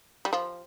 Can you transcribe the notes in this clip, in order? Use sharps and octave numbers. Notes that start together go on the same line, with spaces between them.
G3
F3